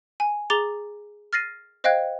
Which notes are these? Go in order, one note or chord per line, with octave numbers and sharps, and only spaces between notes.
G#5
G#4 A#5 D6 A6 F7 G7
F6 A6 A#6 C7 D#7
C5 D#5 F5 G5 F#6 G#6